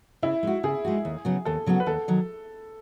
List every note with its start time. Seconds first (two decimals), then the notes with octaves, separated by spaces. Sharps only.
0.22 C#3 E4
0.43 G#3 D#4 F#4
0.63 C#3 G#4
0.85 G#3 D#4 F#4
1.05 D#2
1.25 C#3 F#3 B3 F#4
1.45 D#2 A4
1.66 C#3 F#3 B3 F#4
1.80 B4
1.86 D#2 A4
2.08 D#3 F#3